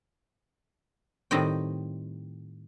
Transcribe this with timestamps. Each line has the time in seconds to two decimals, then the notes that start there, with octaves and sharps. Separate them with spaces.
1.31 A2 D#3 G3 C4 D#5 G5